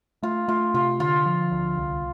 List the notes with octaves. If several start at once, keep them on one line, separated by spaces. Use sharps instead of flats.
A3 F4
A3 F4
C3 F4
D3 F4
F3
D2
C2